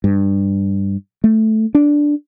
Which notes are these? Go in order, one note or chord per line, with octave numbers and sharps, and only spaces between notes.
G2
A3
D4